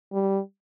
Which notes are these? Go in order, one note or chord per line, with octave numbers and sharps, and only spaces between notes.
G3